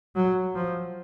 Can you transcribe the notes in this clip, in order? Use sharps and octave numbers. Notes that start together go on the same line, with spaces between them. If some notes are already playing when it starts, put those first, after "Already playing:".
F#3
F3